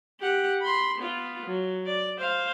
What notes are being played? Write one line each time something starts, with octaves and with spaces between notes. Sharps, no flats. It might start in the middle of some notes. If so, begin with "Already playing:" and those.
G4 F#5
B5 C6
B3 F4
F#3
D5
C5 F5